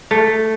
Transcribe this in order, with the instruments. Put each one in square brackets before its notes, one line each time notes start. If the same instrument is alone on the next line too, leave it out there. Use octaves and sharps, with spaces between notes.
[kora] A3